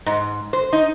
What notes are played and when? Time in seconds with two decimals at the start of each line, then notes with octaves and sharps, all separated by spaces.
0.06 G#2
0.53 C5
0.73 D#4